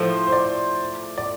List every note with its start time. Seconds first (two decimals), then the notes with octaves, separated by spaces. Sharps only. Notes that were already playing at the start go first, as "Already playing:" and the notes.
Already playing: A2 F3 A3 C5
0.27 C5
0.32 D5
1.18 D5